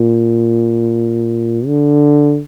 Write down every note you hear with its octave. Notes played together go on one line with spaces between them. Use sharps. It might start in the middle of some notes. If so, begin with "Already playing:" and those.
Already playing: A#2
D3